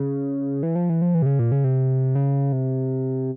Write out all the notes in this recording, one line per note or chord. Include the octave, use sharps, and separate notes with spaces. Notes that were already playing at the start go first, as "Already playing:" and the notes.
Already playing: C#3
E3
F3
E3
F3
E3
C3
C#3
A#2
C#3
C3
C#3
C3